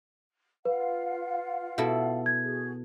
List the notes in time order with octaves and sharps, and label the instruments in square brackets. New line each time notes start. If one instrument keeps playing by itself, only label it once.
[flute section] F4 F5 F#5 [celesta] B4
[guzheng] B2 E4 A4
[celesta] G#6
[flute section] F#4 G#4